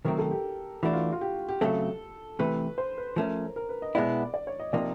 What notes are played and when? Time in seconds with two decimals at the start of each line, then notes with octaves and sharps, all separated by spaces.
0.05 C3 D#3 F#3 A3 C4 A#4
0.18 A4
0.31 G4
0.83 E3 A3 D4 F#4
0.93 F4
1.13 F4
1.21 G4
1.49 G4
1.61 C#3 F#3 A3 C4 A4
2.39 C3 E3 A3 B4
2.78 C5
2.98 B4
3.16 F3 A3 C#4 A#4
3.56 A#4
3.69 B4
3.82 D#5
3.95 B2 G#3 B3 E4 D5
4.34 D5
4.47 C#5
4.60 D#5
4.73 C3 F3 A#3 D#4 D5